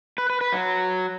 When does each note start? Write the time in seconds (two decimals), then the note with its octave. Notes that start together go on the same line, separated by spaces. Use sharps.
0.18 B4
0.30 B4
0.41 B4
0.53 F#3